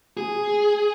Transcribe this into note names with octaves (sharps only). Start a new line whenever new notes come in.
G#4